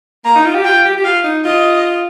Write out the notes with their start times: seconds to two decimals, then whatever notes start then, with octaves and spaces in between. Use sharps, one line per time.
0.25 A#3 A#5
0.35 D#4
0.45 F4
0.54 G4
0.65 F4 G5
0.85 G4
0.97 G4
1.04 F4 F5
1.24 D#4
1.45 F4 D#5